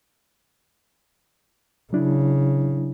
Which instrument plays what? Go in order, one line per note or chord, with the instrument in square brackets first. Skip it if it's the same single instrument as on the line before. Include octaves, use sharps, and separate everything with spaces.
[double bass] C#3 [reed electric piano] F#3 D4 E4